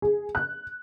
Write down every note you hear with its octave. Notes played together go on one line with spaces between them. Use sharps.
G#4
F#6